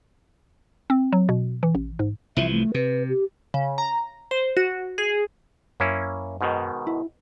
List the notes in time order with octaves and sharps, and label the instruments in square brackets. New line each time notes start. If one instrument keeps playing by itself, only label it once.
[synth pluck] C4
F#3
B2
E3
A1
G#2
[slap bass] C2 E3 F3 [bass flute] E5
[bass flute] A3
[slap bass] C3 [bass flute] B4
[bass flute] G4
[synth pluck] C#3
A#5
C5
F#4
G#4
[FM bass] F#2 [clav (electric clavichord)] A#3 C#4 E4
[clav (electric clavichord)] G#2 B2 D#3
[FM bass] E4